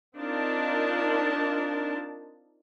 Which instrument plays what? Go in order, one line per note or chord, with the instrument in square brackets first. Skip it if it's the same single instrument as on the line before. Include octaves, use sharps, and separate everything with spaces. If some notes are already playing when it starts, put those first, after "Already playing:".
[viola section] C4 D4 D#4 F4 A#4 A5